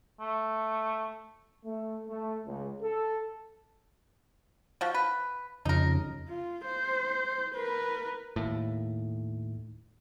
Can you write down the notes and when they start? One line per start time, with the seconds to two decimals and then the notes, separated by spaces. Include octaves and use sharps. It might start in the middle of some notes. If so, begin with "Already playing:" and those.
0.20 A3
1.64 A3
2.08 A3
2.45 C#2
2.81 A4
4.81 F3 F#4
4.94 B4
5.65 F2 C#3 D#4 A#4
6.28 F4
6.65 C5
7.54 A#4 B4
8.36 D#2 A2